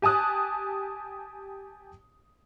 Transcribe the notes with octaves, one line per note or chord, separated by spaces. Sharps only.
G4 G#5 A5 D#6 F#6